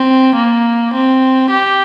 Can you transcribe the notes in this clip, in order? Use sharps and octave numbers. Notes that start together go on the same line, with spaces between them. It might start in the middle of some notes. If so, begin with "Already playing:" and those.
Already playing: C4
A#3
C4
G4